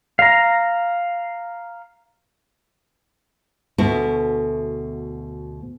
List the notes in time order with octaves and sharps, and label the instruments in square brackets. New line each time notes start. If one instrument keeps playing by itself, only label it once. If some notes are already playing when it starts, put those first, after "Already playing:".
[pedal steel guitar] F5 A#5
[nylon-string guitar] D2 B2 A3 B3 E4